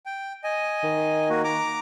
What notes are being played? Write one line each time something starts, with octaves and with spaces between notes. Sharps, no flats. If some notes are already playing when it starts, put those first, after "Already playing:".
G5
D#5 G#5
D#3
A#3 F#4
A#5 D6